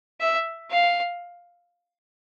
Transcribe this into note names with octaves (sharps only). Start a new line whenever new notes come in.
E5
F5